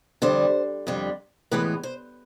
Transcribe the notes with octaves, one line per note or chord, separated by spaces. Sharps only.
F2 D3 G3 C5
F2 D3 G3
A2 E3 G#3 B3 B4
C5